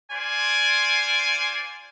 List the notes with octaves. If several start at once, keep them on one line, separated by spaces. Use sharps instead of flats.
F4 C5 D5 G#5